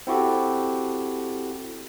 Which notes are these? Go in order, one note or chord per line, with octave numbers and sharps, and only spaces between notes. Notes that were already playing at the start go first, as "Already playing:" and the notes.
C4 E4 F#4 G4 A4